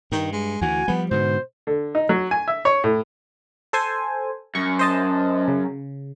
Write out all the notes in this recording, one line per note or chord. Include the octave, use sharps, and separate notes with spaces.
G2 D#3
G#3
D2 E3 F#4 G#5
F3 G3 B3
G#2 B2 D3 C5
D3
D#4
F#3
G#5
E5
C#5
A2
A4 C5 G#5
F#2 C#6
C5 D#5 A5
C#3